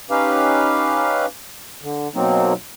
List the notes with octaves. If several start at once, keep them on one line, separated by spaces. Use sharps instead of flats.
C#4 D#4 G4 B4 F5
D3
B2 F#3 A#3 C4 D#4